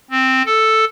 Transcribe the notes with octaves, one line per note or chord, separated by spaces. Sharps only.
C4
A4